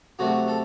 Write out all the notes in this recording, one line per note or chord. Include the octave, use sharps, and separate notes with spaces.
C3 F#3 A3 F#4
A4